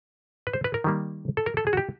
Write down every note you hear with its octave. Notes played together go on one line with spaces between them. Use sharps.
B4
C5
B4
A#4
D#3 G3 A#3
A4
A#4
A4
G#4
F#4
G4